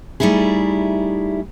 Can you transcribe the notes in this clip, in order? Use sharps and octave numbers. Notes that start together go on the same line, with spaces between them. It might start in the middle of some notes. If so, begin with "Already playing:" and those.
G3 A3 D#4 E4 G#4